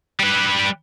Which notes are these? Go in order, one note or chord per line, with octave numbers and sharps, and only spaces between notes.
G3 B4